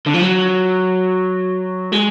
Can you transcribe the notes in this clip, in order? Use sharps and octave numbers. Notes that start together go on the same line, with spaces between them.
D3
F3
F#3
G#3